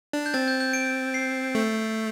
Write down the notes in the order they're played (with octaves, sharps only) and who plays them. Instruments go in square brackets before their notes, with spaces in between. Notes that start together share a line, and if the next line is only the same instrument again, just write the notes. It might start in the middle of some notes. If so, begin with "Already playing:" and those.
[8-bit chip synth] D4
[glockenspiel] G6
[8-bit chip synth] C4 [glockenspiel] A6
[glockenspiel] G6
G6
D7
C7
[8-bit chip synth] A3